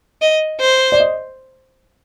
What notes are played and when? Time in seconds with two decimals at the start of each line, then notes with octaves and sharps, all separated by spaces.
0.22 D#5
0.60 C5
0.92 D5
1.00 D#5